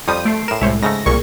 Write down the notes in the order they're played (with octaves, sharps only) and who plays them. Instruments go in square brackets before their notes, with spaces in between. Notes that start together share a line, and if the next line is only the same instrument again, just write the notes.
[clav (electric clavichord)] F2 F3 G3 [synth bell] C6 G6 [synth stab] D#6
[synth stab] A3 [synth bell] C7 D7
[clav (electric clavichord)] A2 A#4 [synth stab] E7
[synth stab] C2 A2 [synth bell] G#3 [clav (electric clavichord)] C5 C#5 E5
[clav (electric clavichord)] G#2 C#3 A3 [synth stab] A#6
[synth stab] C2 A#2 C#6 [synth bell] G#4 A#4